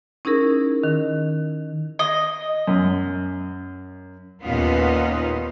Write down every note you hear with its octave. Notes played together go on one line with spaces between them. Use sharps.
C#4 D#4 E4 G#4 A#4
D#3
D#5
F#2
D#2 A#2 B3 C#4 D#4 F4